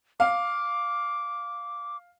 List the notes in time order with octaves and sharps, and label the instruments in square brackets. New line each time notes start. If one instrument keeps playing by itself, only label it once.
[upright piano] F5 [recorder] D6